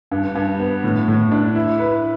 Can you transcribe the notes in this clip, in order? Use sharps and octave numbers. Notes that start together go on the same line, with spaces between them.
G2
G2
B3
A2
A2
D4
E4
B4